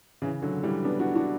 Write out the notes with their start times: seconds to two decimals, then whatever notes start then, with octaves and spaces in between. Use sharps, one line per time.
0.22 C#3 E3
0.42 D3 F#3
0.63 E3 G3
0.85 B3 D4
0.99 D4 F#4
1.15 D4 F#4